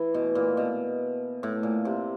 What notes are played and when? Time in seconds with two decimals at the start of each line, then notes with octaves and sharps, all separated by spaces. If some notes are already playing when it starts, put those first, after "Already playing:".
Already playing: E3
0.14 B2
0.35 A#2
0.57 B2
1.43 A2
1.63 A#2
1.85 C3